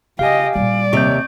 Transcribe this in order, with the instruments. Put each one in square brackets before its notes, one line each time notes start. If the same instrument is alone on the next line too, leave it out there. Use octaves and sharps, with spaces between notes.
[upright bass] C#3 [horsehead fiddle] G4 D#5 [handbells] F5 G#5
[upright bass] A#2 G3 [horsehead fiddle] D5
[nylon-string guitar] D#2 C3 D#5 [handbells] C#6 G6